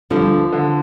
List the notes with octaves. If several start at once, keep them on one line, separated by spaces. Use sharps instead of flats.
D2 D3 F3 G3
D3